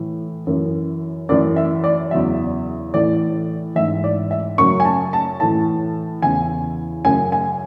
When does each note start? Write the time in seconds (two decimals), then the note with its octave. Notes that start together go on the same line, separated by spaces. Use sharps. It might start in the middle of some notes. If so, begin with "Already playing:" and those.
Already playing: A2 E3
0.47 F#2 E3
1.29 F#2 E3 D5
1.56 E5
1.84 D5
2.11 E2 C#3 F#3 E5
2.94 A2 E3 D5
3.75 E3 E5
3.79 G#2
4.04 D5
4.31 E5
4.58 F#2 C#3 F#3 C#6
4.80 G#5
4.85 A5
5.13 A5
5.40 A2 E3 A5
6.22 E2 C#3 E3 G#5
7.05 F#2 C#3 F#3 G#5
7.32 G#5